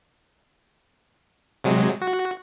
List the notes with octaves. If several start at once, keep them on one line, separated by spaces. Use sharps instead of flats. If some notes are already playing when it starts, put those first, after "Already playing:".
C3 F#3 G#3
F#4